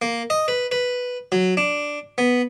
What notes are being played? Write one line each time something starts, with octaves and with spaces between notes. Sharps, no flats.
A#3
D#5
B4
B4
F#3
D4
B3